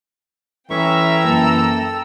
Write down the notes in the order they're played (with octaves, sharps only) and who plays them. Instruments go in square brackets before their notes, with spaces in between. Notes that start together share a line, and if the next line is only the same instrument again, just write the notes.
[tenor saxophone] E3 [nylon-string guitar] A3 [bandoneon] C#4 E5 C#6 [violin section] G5 A#5 E6
[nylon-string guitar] F#2 A#3 [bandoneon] A4